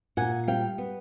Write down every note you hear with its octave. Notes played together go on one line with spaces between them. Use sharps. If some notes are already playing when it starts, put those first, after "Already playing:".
A#2 F#5 G#5
G3 F5 G5
B3